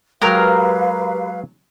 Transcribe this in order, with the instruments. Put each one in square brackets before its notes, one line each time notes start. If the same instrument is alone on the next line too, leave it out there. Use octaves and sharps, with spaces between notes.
[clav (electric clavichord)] F#3 G#3 [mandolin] G4 A#4 F6 [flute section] B4 F5